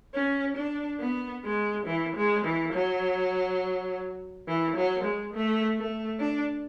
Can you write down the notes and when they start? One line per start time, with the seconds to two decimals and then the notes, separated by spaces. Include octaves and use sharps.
0.14 C#4
0.56 D4
1.00 B3
1.44 G#3
1.86 E3
2.16 G#3
2.45 E3
2.73 F#3
4.48 E3
4.77 F#3
5.04 G#3
5.33 A3
5.77 A3
6.20 D4